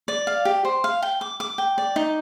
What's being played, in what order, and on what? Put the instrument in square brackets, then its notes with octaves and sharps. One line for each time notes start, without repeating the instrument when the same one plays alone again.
[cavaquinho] D5
F5
G4
C5
F5
G5
D6
D6
G5
D5
D#4